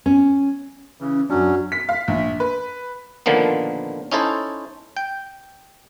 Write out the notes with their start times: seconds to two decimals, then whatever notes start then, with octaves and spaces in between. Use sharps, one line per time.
0.06 C#4
1.00 C#3 E3 C#4
1.30 F#2 F#3 C#4 D4 F#4
1.72 B6
1.89 F5
2.08 A#1
2.40 B4
3.26 A#2 D3 D#3 F3 A#3 B3
4.12 C#4 D#4 E4 A4 C5
4.97 G5